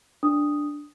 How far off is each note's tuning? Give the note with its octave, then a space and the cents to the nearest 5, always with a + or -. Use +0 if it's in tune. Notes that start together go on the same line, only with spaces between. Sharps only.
D4 +0 D#6 +0